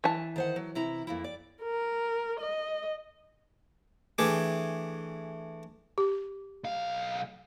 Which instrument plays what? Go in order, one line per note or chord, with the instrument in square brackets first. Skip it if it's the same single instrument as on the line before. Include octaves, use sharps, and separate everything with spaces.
[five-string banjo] E3 A5
[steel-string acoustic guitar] D#3 C5 F#5
F#3
C3 E4 A#5
F2 A#3 E4
D5
[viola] A#4
D#5
[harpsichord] E3 A3 D4 G4 G#4
[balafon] G4
[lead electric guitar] B1 F5